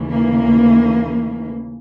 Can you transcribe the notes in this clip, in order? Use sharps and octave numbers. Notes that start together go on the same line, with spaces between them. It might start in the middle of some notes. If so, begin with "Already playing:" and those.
Already playing: D#2 C#3 E3 A3
A#3